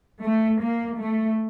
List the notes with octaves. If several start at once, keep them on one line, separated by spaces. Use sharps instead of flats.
A3
A#3
A3